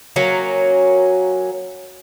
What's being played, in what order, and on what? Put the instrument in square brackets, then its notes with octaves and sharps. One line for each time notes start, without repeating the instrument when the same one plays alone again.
[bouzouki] F#3 A#3 C#4